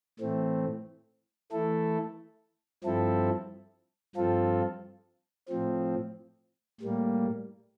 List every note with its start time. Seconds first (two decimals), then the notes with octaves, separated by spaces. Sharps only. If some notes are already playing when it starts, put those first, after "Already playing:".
0.19 A2 E3 A3 C4
1.52 E3 A3 E4 A4
2.84 G2 F3 C4 E4 A4
4.15 G2 F3 C4 F4 A4
5.49 A2 F3 C4
6.81 A2 G3 A#3